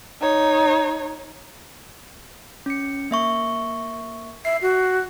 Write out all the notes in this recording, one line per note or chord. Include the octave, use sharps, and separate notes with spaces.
D#4 C#5
C#4 C#7
A#3 E5 C#6
E5 C7
F#4